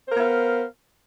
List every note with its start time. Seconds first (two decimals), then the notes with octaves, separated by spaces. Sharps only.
0.07 C5
0.11 A#4
0.15 B3
0.19 F5